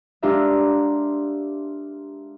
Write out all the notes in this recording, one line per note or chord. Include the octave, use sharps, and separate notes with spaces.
G#3 D4 F4 G4 A#4 E5